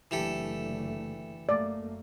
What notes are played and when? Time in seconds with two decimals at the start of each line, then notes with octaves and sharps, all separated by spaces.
0.11 F#1 D3 E3 A3 G4 A4
1.49 F#2 A3 A#3 D5